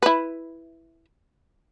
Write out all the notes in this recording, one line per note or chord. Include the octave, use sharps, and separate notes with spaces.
E4 B4